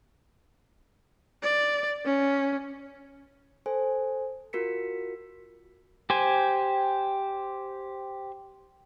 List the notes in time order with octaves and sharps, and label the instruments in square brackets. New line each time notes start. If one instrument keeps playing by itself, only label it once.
[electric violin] D5
C#4
[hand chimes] A4 C5 G#5
F4 F#4 A#4 B6 C#7
[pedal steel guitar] G4 C5 G#5